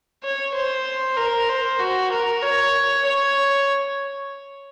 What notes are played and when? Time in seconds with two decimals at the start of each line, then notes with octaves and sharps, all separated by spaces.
0.23 C#5
0.55 C5
1.17 A#4
1.49 C5
1.79 F#4
2.12 A#4
2.43 C#5
3.04 C#5